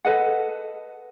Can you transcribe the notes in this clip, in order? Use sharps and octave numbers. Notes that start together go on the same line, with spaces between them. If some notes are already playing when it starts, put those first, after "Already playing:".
A4 B4 D#5 F#5